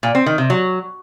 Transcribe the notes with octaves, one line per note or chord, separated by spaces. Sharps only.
A#2
C4
D#3
C3
F#3